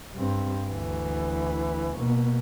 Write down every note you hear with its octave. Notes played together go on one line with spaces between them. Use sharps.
G2 C4
D2 E3
B2 A#3